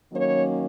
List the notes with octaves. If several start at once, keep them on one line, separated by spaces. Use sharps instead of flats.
D#3 F#3 A#3 C#4 C#5